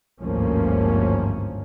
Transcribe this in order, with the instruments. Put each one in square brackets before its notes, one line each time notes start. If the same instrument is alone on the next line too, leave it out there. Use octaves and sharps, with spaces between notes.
[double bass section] G#1 D2 G2 F3 A#3 C#4